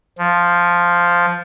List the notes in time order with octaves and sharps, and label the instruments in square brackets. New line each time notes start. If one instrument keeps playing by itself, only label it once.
[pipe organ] F3